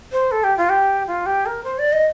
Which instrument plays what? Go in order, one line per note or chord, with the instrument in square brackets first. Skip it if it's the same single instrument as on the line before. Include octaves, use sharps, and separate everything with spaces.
[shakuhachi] C5
A4
G4
F4
G4
F4
G4
A#4
C5
D5
D#5